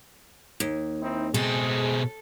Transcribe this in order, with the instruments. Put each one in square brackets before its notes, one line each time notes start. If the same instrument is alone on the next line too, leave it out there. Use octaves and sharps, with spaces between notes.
[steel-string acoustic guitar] D#2
[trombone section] C4 D#4 E4
[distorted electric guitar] B2 C4 [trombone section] G#3 G#4 [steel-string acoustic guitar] A4